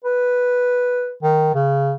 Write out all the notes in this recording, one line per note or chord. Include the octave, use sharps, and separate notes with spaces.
B4
D#3
C#3